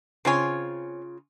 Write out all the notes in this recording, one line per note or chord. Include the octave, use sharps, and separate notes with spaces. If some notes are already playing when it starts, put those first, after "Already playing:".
C#3 C4 F4 C#5 G#5